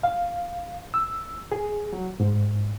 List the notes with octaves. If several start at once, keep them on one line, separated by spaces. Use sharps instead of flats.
F5
E6
G#4
F#3
G#2